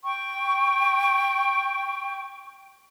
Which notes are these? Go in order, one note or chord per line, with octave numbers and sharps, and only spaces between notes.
G5 C#6